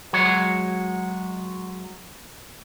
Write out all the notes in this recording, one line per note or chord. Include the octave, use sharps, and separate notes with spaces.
F#3 G#3 C#5